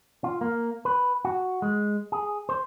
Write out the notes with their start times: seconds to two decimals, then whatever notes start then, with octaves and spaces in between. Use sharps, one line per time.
0.24 F4
0.41 A#3
0.85 B4
1.25 F#4
1.62 G#3
2.12 G#4
2.49 C5